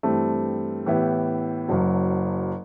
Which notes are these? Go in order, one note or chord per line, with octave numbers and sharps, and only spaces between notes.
G2 E3 A3 C4
A2 E3 B3 E4 G4
F#1 F#2 F#3